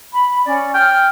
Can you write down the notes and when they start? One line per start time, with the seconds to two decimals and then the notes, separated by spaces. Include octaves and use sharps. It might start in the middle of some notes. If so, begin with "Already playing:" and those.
0.13 B5
0.45 C#4 D5
0.74 G5 F6